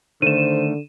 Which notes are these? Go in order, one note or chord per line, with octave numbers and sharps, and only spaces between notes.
D3 D#3 A3 C5 D#7 E7